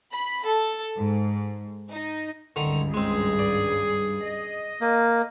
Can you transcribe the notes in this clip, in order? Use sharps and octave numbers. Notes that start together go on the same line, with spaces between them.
B5
A4
G#2
D#4
G#1 C#2 G2 D3 D#3 A#5
G#3 C4 G#4
D5
D#5
A#3